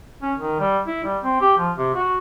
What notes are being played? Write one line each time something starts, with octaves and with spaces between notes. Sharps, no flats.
C#4
D#3
G3
E4
G3
C4
G4
F3
C3
F#4